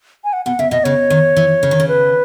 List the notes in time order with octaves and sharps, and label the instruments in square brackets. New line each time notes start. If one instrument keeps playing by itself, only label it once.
[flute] G#5
F#5
[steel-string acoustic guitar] B2 [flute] F#5
[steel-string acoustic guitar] C#3 [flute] E5
[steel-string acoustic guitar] B2 [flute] D#5
[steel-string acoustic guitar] C#3 [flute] C#5
[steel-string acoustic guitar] D#3
E3
C#3
D#3
C#3
[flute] B4